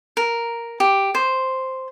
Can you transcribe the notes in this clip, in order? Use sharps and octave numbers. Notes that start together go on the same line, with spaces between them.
A#4
G4
C5